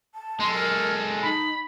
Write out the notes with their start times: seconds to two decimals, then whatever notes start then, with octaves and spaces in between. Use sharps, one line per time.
0.15 A5
0.40 G#3 A4 C6
0.54 A#4
1.22 D#4 B5